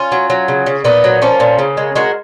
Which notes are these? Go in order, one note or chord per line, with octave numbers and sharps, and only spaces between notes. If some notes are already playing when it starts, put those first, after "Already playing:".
Already playing: C#4 F4
F#3
F#3
C#3
C#3
A#2 B3 D#4
F#3
F3 A#3 C#4
A#2
C#3
G#3
G#3 F#4 A#4